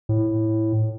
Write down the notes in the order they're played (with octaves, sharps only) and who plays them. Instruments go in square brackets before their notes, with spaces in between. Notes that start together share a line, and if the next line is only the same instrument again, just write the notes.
[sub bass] A2